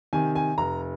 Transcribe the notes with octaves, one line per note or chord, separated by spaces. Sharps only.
C3 D#3 G#5
G#5
F1 A#5